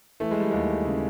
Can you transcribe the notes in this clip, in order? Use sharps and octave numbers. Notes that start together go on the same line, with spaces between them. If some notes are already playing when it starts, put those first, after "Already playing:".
E3 A3
G#3
G3
D#2 G#3
C#3